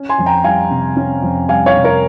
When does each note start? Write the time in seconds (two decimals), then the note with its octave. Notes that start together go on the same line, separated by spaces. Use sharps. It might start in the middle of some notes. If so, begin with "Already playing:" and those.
Already playing: C#4
0.09 G#5 C6
0.18 F2
0.26 G5 A#5
0.44 G3 F5 G#5
0.71 C3
0.96 C#4
1.23 F2
1.49 G3 F5 G#5
1.66 C#5 F5
1.75 C3
1.84 A#4 C#5